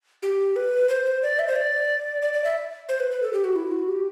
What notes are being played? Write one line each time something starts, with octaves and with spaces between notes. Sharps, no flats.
G4
B4
C5
C5
D5
E5
C5
D5
D5
D5
E5
C5
B4
B4
A4
G4
F#4
E4
F#4
G4